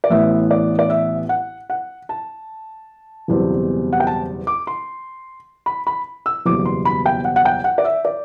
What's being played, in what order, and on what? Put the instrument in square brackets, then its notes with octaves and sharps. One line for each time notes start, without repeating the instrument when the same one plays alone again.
[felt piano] D5
A1 A2 E3 B3 E5
D5
D5
E5
F#5
F#5
A5
F#1 E2 B2 G3 C4
F#5
G5
A5
D6
C6
B5
B5
E6
F#1 E2 B2 G3 D6
C6
B5
G5
F#5
F#5
G5
F#5
D5
E5
D5